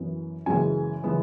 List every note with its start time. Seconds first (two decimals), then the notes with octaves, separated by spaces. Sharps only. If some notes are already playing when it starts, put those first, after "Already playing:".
Already playing: F#2 E3 B3
0.46 F#2 C#3 E3 G#3 B3 G#5
1.04 C#3 E3 G#3 B3